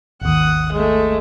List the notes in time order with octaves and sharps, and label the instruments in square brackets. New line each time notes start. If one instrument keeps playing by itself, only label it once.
[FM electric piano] G#1 D#2 [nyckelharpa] F#5 D#6
[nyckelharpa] G#3 A3